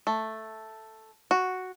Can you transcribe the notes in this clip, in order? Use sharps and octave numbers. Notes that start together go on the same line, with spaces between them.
A3
F#4